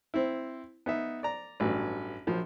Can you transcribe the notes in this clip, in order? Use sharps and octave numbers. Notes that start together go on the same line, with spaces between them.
C4 E4
B3 D#4 E5
D5 A#5
A1 G2 F#3
A#1 F3 F#3